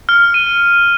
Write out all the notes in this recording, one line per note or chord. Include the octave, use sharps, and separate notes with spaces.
F6
D#7